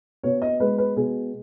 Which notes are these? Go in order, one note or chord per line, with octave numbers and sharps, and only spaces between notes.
B2 C#5
D#5
G#3 B4
B4
B2 G#4